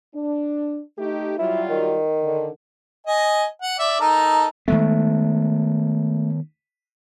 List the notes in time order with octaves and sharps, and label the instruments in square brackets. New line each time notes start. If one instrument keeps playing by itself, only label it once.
[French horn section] D4
A3 D#4 G4
[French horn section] F#3 G3 F4 [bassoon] E4
[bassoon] D#3
[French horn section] D3
[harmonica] D#5 G#5
F#5
D5 E5
D#4 A4 A#4
[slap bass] D#3 G#3 B3 [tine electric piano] A3